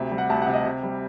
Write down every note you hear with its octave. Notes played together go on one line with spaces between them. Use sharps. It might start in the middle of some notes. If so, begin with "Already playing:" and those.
Already playing: D2 C3
G3
F#5
D2 A5
F#5
C3
D#5
C3
G3